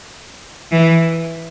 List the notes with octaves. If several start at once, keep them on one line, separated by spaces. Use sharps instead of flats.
E3